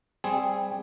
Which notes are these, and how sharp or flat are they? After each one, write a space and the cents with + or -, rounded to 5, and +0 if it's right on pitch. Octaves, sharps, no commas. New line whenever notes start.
G3 +15 C4 +0 G#4 +0